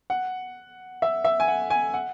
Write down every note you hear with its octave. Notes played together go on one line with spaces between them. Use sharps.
F#5
E5
E5
G#5
F#5
G#5
F#5